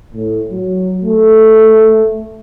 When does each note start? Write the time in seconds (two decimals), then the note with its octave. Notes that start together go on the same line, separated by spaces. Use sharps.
0.15 A2
0.51 F#3
1.03 A3